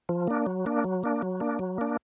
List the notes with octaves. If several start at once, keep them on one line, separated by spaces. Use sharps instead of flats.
F3
A#3 D4
F#3
A#3 D4
F#3
A#3 D4
F#3
A#3 D4
F#3
A#3 D4